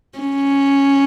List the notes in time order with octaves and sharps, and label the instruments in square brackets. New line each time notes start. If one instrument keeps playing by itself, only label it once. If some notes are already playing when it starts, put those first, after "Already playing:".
[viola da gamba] C#4